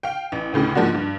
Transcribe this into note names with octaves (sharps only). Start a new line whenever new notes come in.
F5 G5
A1
A1 D2 A2 C#3
G#2 F3 A#3 D4 F#4
G2